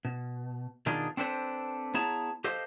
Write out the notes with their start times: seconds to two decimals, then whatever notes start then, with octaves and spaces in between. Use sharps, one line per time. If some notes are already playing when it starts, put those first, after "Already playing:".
0.05 B2
0.86 B2 D#3 D4 D#4 F4 G#4
1.17 C4 D4 A4 B4 C5
1.94 B3 E4 G#4 C#5 A5 A#5
2.44 G4 A4 C5 D#5 F5